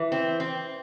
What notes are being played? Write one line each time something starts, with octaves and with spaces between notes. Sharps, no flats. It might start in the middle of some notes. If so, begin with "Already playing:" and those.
Already playing: E3
C4
C4